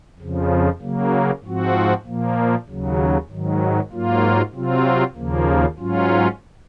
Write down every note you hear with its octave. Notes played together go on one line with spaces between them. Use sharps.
F2 C#3 F3
C#3 F#3 A#3
G#2 F3 C4 F#4
A#2 F3 A#3
D#2 C#3 F#3
G#2 D#3 F#3
G#2 F#3 A#3 F4
C3 F#3 C4 F4
D#2 C#3 F3 A#3
G#2 F#3 C#4 F4